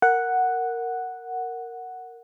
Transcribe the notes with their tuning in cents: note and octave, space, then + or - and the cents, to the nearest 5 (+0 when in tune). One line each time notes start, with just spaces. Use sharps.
A#4 -10 F#5 +0